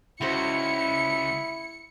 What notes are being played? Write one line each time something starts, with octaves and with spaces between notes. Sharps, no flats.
C#2 E4 F#4 C5 C#7